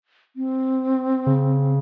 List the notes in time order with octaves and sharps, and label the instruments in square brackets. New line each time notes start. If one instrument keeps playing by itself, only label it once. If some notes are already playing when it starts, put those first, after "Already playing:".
[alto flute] C4
[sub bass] C#3